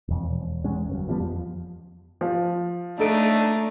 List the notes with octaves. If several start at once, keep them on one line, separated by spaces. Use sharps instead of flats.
E1 F2
E1
E2 G#3 C#4
G1 F#2
E3 F3 G3 B3
F2 F3
F3
A3 D4 D#4 A4 D7